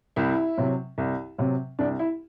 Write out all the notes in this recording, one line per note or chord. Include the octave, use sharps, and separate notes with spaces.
C2 E4
C3 F#3
C2
C3 F#3
C2 D4
E4